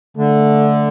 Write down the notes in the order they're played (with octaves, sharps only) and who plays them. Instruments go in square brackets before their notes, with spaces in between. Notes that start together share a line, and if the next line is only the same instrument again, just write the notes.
[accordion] D3 [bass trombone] A3